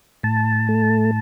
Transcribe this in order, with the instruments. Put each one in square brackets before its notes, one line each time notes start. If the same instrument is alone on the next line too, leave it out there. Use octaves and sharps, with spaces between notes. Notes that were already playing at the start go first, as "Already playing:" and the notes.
[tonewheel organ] A2 A5
A3